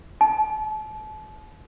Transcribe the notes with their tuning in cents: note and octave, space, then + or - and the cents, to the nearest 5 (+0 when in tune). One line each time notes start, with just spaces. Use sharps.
A5 -35